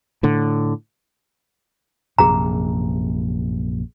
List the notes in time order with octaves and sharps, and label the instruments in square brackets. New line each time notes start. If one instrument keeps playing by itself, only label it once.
[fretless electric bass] A2 D3
[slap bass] A#1 F#2 C3 [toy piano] G#4 A#5